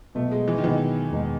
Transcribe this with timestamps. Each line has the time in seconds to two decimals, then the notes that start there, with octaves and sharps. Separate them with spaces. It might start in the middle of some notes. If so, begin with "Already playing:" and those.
0.15 B2 F#3 A3 B3
0.31 G#3
0.48 E3
0.58 D#3
0.63 B2 E3 F#3 B3
1.11 E2 B2 G#3 B3 D#4